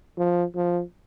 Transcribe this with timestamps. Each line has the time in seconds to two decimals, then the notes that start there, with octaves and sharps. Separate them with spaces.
0.18 F3
0.56 F3